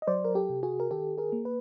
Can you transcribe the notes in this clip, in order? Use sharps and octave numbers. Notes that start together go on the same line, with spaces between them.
D#5
F#3 C5 D5
A#4
G4 A4
C3
F#4 G#4
A#4
D#3 G4 A4
G#4 A#4
A#3
B4